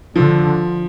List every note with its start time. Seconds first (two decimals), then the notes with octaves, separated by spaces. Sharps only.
0.15 D3 F3